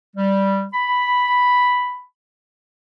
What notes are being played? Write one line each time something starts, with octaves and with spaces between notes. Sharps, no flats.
G3
B5